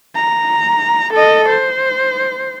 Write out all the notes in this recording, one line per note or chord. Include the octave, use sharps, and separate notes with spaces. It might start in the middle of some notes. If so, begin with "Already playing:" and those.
A#5
A4 D#5
C5